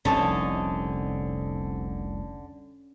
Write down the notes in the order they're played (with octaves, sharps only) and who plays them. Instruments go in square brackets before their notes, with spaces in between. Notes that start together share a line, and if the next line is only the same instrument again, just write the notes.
[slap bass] F1 C2 [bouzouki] D3 [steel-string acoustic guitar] C4 D#4 [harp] C#4 A5 D#6